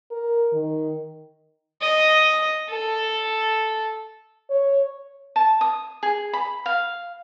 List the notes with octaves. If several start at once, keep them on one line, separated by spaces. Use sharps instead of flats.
A#4
D#3
D#5
A4
C#5
A5
D#6
G#4
B5
F5